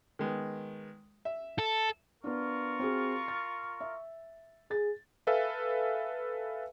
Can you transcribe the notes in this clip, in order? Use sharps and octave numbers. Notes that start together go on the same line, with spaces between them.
D#3 G#3 B3
E5
A4
B3 D4 F4 A#4 C#6
C4 F#4 G#4
A6
E5
G#4 A6
A4 B4 E5 F5 G#5